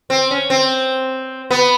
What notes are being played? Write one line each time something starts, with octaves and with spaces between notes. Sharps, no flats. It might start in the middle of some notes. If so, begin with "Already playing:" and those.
C4
C#4
C4
B3